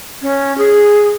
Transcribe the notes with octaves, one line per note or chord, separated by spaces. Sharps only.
C#4
G#4